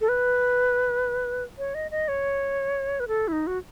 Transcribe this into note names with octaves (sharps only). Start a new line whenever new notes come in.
A4
B4
C#5
D#5
D#5
C#5
B4
A4
E4
D#4
F#4